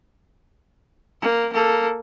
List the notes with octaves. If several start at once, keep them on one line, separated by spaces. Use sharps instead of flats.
A#3
A#3 A4